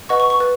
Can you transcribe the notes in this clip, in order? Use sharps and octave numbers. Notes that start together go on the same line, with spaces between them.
B4 D#5 F#5 C#6
C#6
C#6
B4